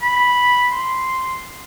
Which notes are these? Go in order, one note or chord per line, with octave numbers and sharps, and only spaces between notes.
B5
C6